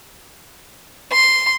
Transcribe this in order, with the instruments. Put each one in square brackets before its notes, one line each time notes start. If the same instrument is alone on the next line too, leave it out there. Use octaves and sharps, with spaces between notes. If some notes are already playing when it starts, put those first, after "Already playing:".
[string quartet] C6